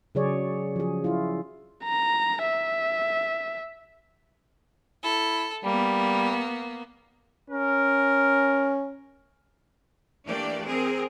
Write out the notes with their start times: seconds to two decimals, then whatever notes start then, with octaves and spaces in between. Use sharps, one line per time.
0.15 C#3 F#3 G#4 C#5 D5
0.76 F3 G#4
1.04 E4 F4
1.84 A#5
2.43 E5
5.04 E4 A4
5.64 G3 A#3 B3
7.50 C#4 A#4
10.26 E3 A3 A#3 D4 G4 D5
10.65 C4 G#4 A#4